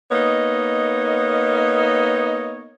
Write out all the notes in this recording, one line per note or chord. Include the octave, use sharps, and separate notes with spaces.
A#3 B3 D#4 C#5 D#5